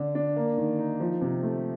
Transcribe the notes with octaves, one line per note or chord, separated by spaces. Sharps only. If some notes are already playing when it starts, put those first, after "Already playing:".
Already playing: D3 D4
D4
A#3
D#3
D#4
F3
C3
A3